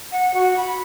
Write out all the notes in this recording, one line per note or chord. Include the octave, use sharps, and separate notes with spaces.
F#5
F#4
B5